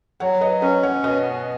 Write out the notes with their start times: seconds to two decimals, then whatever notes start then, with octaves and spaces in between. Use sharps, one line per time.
0.20 F#3 C#5 F#5
0.41 B4 D#5
0.62 C#4 B4 D#5
0.83 C#5 F#5
1.03 B2 B4 D#5